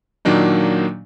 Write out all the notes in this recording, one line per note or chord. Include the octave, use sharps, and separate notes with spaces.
A#2 D#3 F#3 A#3 D4 D#4